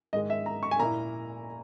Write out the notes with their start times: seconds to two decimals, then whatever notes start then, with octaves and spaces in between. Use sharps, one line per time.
0.13 G#2 D#3 G#3 D#5
0.30 E5
0.46 A#5
0.63 C#6
0.71 G#5
0.79 A#2 A#3 E4 A#5